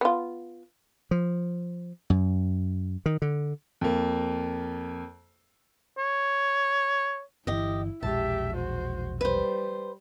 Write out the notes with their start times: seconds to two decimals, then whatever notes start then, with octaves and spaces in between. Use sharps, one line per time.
0.01 B3 F4
1.11 F3
2.10 F#2
3.06 D#3
3.22 D3
3.81 F2 A#3
5.98 C#5
7.47 G1 E3 E4 G4 D#5
8.03 E1 A#1 G#3 G4 E5 A5
8.54 F#4 C5
9.21 G3 B4 C5